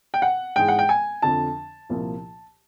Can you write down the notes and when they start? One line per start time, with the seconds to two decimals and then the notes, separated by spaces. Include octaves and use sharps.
0.14 G5
0.22 F#5
0.56 G#2 E3 G#3 G5
0.68 F#5
0.79 G5
0.89 G#5
1.22 F2 D3 F3 A5
1.89 C2 A#2 F3 A#3